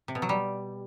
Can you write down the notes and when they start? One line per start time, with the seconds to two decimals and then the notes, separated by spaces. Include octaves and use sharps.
0.08 C3
0.15 B2
0.22 F#3
0.29 G3